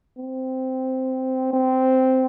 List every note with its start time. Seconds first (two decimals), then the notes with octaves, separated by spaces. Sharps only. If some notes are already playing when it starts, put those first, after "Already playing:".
0.17 C4
1.53 C4